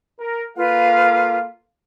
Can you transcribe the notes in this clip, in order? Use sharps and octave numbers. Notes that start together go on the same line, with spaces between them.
A#4
A#3 F4 A4 B4 F5